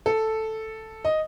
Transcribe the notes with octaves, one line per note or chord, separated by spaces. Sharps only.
A4
D#5